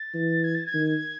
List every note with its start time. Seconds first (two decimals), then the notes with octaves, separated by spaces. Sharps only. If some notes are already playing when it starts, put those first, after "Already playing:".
Already playing: A6
0.14 E3
0.44 G#6
0.54 A6
0.66 G#6
0.74 D#3